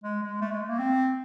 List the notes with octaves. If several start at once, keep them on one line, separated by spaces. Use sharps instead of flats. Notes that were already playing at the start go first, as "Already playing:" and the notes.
G#3
G#3
A3
G#3
A3
A#3
C4